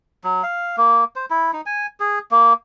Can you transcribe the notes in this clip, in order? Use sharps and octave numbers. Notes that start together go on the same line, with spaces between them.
F#3
F5
A#3
C5
E4
D#4
G#5
G#4
A#3